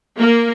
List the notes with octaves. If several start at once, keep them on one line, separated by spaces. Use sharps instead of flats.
A#3